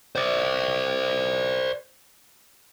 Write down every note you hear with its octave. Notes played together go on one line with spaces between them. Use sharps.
C5 D5